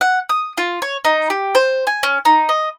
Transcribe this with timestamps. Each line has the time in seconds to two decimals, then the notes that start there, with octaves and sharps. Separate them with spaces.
0.01 F#5
0.29 D#6
0.58 F4
0.82 C#5
1.05 D#4
1.30 G4
1.55 C5
1.87 G#5
2.03 C#4
2.25 D#4
2.49 D#5